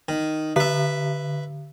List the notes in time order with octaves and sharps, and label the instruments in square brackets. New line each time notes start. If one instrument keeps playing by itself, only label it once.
[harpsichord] D#3
[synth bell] D3 [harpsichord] B4 E5